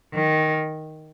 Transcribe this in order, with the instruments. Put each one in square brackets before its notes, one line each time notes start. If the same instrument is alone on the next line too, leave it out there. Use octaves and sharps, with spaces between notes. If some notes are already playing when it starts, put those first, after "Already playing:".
[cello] D#3